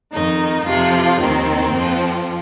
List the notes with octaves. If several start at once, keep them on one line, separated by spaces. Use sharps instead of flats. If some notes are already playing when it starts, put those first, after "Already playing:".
F2 D#3 D#4
F2 C3 F3 F4
D#2 D#3 C4
F2 F3